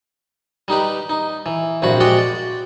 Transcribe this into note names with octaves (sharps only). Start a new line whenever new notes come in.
G3 D#4 G4 B4
D#4
E3
A#1 G2 C3 F#4 B5
G#3 F#4 G4 D5 F#5 G5
D5